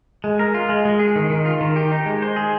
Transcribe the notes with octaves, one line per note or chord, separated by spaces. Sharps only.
G#3
A#4
F4
G#3
G#3
G#4
D#3
D#3
F4
D#3
G4
D#4
G#3
C5
G#4